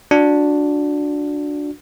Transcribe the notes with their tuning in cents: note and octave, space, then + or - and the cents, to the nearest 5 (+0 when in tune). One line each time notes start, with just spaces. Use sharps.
D4 +0 F#4 -25